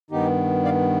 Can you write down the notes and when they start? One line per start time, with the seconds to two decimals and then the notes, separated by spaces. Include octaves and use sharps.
0.11 G2 D#3 B3 D#4 G4
0.64 D5 F5